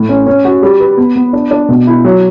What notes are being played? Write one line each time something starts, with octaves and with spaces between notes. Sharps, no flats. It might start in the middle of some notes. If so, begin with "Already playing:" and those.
Already playing: A2
C#4
C#4
F#4
G3
B4
B3
B3
D4
D4
B2
E4
F#3